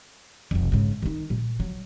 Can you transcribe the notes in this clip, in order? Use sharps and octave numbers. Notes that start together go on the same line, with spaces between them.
F1 B1
G#2 C#3
D#3 D#4
A#2
F#3